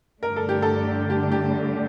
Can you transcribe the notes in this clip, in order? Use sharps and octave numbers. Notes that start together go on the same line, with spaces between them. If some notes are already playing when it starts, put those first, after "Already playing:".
G2 D3 A3 D4 A#4
A4
G4
A4
G4
G4